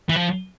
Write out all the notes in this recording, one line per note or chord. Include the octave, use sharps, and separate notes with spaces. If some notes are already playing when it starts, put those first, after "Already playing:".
E3
F3